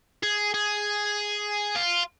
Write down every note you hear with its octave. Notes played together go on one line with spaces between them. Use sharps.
G#4
G#4
F4